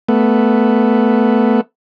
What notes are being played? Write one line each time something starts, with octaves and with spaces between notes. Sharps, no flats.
A3 B3